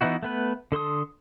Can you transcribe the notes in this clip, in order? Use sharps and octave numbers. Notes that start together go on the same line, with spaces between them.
E3 B3 D#4 E4 F#4
A3 B3 B4
D3 A4 C6 D#6